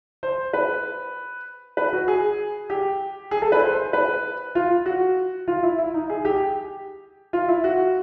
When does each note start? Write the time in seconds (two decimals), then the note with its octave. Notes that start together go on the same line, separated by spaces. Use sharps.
0.23 C5
0.53 B4
1.77 B4
1.93 F#4
2.08 G#4
2.70 G4
3.31 G#4
3.42 A4
3.52 B4
3.62 C5
3.73 C5
3.93 B4
4.55 F4
4.86 F#4
5.48 F4
5.63 E4
5.78 E4
5.94 D#4
6.10 G#4
6.25 G4
7.33 F4
7.48 E4
7.64 F#4